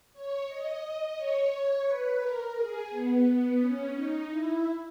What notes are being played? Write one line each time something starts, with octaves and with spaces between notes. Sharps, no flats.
C#5
D#5
C#5
B4
A#4
G#4
B3
C#4
D#4
E4